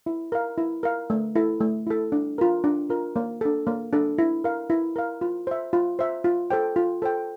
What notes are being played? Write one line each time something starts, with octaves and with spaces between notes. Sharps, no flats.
E4
A#4 F5
E4
A#4 F5
A3
E4 A4
A3
E4 A4
D4
F4 A#4
D4
F4 A#4
A#3
D4 A4
A#3
D4 A4
E4
A#4 F5
E4
A#4 F5
F4
C5 E5
F4
C5 E5
F4
A4 C5 G5
F4
A4 C5 G5